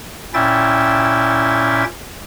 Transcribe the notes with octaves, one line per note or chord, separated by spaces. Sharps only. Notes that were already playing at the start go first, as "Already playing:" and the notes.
A#2 C#4 E4 E5 G5 A6